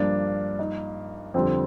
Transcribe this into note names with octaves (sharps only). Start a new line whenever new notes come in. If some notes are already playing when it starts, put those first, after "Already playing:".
Already playing: G2 F3 A#3 D4
D#4
F2 D3 G3 C4